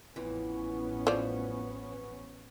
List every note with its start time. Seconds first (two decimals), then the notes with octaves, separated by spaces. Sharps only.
0.16 A1 F2 E3 B3 C#4
1.07 F3 D5